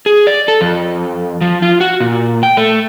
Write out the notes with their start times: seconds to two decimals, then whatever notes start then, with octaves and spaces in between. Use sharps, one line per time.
0.06 G#4
0.27 D5
0.48 A4
0.61 F2
1.41 F3
1.62 F4
1.81 F#4
2.00 A#2
2.43 G5
2.57 A3